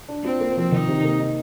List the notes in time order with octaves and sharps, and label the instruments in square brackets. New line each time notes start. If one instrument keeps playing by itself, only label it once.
[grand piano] D4
[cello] C4 [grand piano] F4
[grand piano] A#3
F3
[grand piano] D#3 [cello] D#4
[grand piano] C3
A#3
D#4